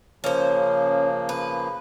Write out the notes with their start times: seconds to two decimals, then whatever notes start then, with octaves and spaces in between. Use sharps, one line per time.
0.24 C#3 F3 A#3 C#4 C5
1.29 B4